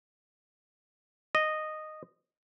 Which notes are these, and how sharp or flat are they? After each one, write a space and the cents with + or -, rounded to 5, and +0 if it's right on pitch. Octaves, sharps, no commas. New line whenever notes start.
D#5 -10